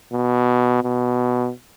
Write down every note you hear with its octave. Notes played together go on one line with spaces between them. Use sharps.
B2
B2